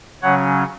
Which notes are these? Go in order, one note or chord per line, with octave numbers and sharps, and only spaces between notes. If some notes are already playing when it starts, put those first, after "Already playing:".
C#3 F#3 C#4 C#5 F#5